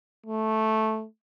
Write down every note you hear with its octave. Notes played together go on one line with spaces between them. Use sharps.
A3